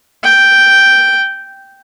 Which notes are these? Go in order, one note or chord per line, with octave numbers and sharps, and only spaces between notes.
G5